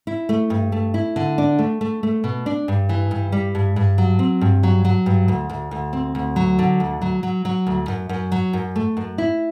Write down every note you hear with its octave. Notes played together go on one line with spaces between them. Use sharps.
E4
A3
G2
A3
E4
D3
D4
A3
A3
A3
B2
D4
G2
E3
G2
G3
G2
G2
F#3
C4
G2
F#3
F#3
G2
D2
D2
D2
C4
D2
F#3
D3
D2
F#3
F#3
F#3
D2
F#2
F#2
F#3
F#2
A3
F#2
E4